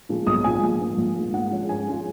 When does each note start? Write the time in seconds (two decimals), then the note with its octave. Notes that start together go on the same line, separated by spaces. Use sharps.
0.09 A#2 F3 G#3
0.27 B1 D#6
0.44 A#2 F3 G#3 G#5
0.62 A#1
0.80 G#2 F3 A#3
0.98 A#1
1.16 G#2 F3 A#3
1.33 G#2 F#5
1.51 F3 G#3 C#4 F4
1.69 G#2 G#5
1.87 F3 G#3 C#4 F4